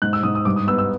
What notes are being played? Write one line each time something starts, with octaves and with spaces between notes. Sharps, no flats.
G#2 F#6
E6
G#2 D#6
D#6
G2 D6
D#6
B3 E6
E6